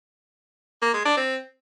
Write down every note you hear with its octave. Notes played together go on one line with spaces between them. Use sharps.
A#3
G#3
D4
C4